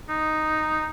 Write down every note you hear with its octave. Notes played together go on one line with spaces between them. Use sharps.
D#4